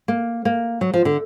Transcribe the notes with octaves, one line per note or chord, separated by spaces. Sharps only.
A#3
A#3
F#3
F3
D3